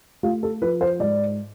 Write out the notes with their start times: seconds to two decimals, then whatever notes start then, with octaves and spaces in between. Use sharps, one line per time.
0.23 A3 F4
0.43 A4
0.62 F3 B4
0.81 C5
1.00 G#2 D5